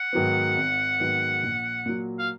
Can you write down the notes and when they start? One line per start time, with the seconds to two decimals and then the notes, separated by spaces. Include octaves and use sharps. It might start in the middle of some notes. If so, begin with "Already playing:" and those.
Already playing: F#5
0.13 G#2 D#3 F#3 B3
0.56 G#1
1.00 G#2 D#3 F#3 B3
1.43 A#1
1.86 A#2 F#3
2.19 F5